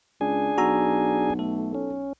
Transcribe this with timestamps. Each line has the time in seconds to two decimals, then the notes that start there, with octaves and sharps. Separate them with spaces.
0.21 C#2 D4 G#4 G#5
0.58 B1 F#4 A#5 E6
1.39 A3 A4
1.75 C#4